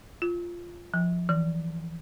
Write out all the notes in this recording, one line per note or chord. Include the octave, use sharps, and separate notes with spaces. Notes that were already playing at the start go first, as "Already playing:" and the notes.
F4
F3
E3